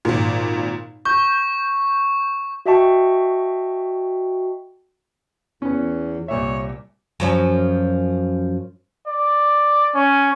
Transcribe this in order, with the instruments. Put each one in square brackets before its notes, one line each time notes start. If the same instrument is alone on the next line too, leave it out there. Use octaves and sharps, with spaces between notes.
[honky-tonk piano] G#1 A#2
[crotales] C#6 [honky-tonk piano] G6
[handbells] F#4 D#5 E5 G5 A5 C#6
[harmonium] E2 [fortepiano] B3 C#4
[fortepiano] C2 A#2 E5 [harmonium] C#5
[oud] F#2 F3 C#4
[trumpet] D5
C#4